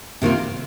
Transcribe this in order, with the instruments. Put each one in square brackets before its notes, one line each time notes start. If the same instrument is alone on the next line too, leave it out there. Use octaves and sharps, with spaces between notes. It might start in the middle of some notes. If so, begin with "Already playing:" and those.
[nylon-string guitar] C3 D#3 A#3 F4